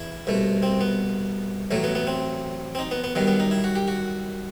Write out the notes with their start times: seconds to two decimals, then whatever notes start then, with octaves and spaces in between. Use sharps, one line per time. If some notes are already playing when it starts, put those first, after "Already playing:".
Already playing: E2 E4
0.27 C2 B2 A3
0.63 C4
0.81 B3
1.71 A1 A2 F#3 A3
1.84 B3
1.95 B3
2.07 C4
2.75 C4
2.79 D#4
2.91 B3
3.04 B3
3.15 F#2 D#3 G3 B3
3.27 B3
3.40 D#4
3.51 E4
3.64 F#4
3.76 G4
3.88 F#4